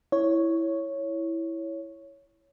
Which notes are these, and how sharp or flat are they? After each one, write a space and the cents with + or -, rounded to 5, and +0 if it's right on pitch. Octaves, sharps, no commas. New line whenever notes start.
E4 +0 C#5 +0